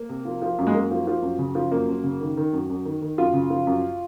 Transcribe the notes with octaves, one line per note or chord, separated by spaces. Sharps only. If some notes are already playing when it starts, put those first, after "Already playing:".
Already playing: A#3
C3
F3
F3
F#2
G#3
F#2 A#3
F3
F3
F#2
C#3
F3
F#2 A#3
F#2
C#3
D#3
D#3
F#2
F#2
D#3
D#3
F#2 F4
C#3
F3
F#2